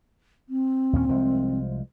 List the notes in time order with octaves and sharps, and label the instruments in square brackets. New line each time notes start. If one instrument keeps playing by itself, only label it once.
[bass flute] C4
[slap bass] D#2 A#2 C#4
C2 F3 G#3